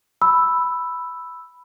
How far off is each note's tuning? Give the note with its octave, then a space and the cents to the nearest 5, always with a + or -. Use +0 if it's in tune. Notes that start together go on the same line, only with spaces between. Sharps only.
B5 +0 E6 +0